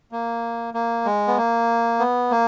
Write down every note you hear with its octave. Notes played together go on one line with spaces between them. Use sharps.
A#3
A#3
G#3
B3
A#3
B3
A#3